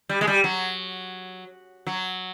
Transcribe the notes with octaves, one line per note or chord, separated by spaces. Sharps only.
G3
G#3
G3
F#3
F#3